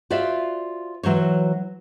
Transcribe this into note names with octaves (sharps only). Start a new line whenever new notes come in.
F4 F#4 C5 D5 E5 F5
E3 F#3 C5 C#5